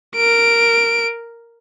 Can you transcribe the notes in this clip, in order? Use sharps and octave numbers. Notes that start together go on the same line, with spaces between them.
A#4 D7